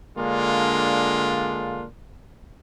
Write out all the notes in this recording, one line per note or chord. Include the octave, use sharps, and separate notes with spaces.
D3 G#3 A#3 D4 F4